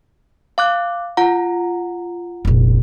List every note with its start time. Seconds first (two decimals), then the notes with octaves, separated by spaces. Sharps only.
0.58 F5 D6 F#6
1.17 F4 F#5 A#5
2.45 F1 A#1